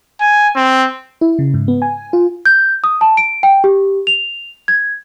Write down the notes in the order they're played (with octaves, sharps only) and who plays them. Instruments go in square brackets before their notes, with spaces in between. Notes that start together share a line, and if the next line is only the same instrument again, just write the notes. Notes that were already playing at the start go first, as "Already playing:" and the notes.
[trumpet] G#5
C4
[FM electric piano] E4
C#3
G#2
B3
G#5
F4
[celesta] G6
D#6
A5
D7
G5
G4
F7
G#6